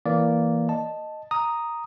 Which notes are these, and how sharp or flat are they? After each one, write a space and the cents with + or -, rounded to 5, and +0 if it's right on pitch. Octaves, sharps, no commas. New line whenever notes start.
E3 +0 A#3 +0 D5 -10
D#5 -5 A5 +0
A#5 +0 D#6 +0